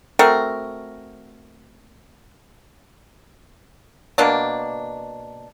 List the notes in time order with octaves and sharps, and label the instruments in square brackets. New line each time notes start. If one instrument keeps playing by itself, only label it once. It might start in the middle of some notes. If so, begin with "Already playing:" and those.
[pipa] A3 C4 F#4 A#4
B2 A#3 D4